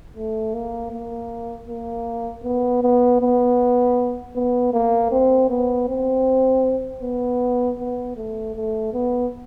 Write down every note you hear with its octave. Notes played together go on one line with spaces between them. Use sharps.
A3
A#3
A#3
A#3
B3
B3
B3
B3
A#3
C4
B3
C4
B3
B3
A3
A3
B3